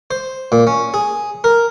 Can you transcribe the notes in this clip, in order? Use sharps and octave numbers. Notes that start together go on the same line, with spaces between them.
C5
A#2
C#4
G#4
A#4